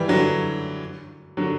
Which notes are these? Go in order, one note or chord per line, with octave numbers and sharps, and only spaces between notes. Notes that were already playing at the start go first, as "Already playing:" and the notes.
Already playing: E3 G3
D3 F#3
D3 F#3